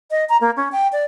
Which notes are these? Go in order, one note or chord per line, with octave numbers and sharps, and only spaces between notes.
D#5
A#5
A#3
C#4
G5
D5